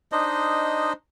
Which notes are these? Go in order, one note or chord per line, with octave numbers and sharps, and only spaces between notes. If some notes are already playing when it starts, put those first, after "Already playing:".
D4 D#4 C5 D#5